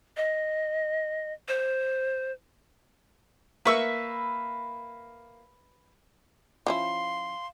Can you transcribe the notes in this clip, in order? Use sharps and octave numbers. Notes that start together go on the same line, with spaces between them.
D#5
C5
A#3 B4 E5 C#6 E6
F3 C#4 E4 F5 C6